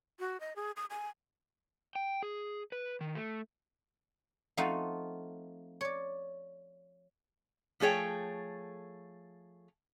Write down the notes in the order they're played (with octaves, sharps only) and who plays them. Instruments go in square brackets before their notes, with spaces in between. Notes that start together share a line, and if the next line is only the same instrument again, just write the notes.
[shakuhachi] F#4
D#5
G#4
D#6
G#5
[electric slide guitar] G5
G#4
B4
D#3
A3
[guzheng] F3 A3 C4 D#4 F4 F#4
C#5 D5
[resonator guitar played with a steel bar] F3 A3 G#4 C#5 G5